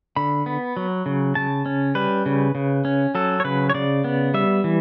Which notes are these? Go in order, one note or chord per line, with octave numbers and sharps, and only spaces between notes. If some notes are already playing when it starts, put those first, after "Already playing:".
D3 B5
B3
F#3
C#3
C#3 A5
C#4
G3 B4
C#3
C#3
C#4
F#3 A4
C#5
C#3 B4
C#5
C#3 D5
B3
G3 E5
E3